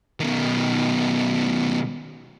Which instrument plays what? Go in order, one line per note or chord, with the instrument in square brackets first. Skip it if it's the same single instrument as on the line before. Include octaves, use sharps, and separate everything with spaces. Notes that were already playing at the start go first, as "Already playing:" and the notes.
[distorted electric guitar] B2 D#3